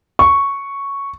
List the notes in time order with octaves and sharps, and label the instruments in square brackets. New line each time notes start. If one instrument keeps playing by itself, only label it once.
[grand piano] C#6